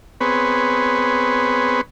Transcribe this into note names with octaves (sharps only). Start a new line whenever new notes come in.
B3 C4 G#4 B4 C#5